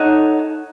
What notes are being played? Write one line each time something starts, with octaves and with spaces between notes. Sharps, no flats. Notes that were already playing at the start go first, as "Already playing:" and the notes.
Already playing: D#4 A4 C#5 F#5